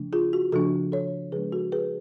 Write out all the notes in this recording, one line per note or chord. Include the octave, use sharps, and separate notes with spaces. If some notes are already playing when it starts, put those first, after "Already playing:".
Already playing: C#3 F3 A3 D4
F4 G#4
F#4
C#3 F3 A3 D4 F#4 A4
A4 C#5
C#3 F3 G#3 B3 D4 G#4 B4
F#4 A4
G#4 B4